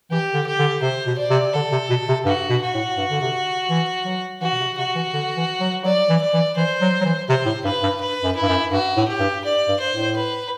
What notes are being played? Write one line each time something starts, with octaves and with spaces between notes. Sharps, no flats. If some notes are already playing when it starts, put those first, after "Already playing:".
E3 G4
D3
G4
D3
C3 C5
B2
D5
C3
D3 A4
C3
B2
C3
G2 F#4
B2
F#4
A2
G2
D3
C3
E3
F#3
E3 F#4
B2
C3
C3 F#4
E3
D3
E3
F#3
F#3 D5
E3
D5
E3
E3 C5
F#3
F#3
E3
C3 C5
A2
G2 B4
G2
B4
F#2
E4
G2
F#2
G2 F#4
A2
G4
G2
D5
G2
C5
A2
B4